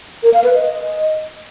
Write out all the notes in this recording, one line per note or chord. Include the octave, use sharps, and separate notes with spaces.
A#4
F5
B4
D#5